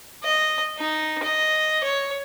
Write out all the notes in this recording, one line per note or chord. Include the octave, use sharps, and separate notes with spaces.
D#5
D#4
D#5
C#5